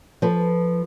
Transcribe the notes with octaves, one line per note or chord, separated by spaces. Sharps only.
F3 A4 B4